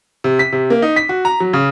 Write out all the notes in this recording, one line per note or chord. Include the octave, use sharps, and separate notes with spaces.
C3
B6
C3
A#3
D#4
B6
F#4
A#5
F#3
C#3